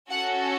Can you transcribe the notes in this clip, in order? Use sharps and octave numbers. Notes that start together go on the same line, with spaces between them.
C#4 F#4 A4 F#5